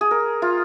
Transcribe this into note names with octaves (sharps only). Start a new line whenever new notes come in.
G#4
A#4
F4